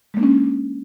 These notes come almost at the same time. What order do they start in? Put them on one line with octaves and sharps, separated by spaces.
G#3 A#3 D4 C#4